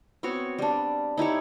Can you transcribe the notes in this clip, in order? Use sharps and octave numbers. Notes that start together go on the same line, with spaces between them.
B3 C4 F#4 C#5
G3 D4
D#4 E4 G4 C#5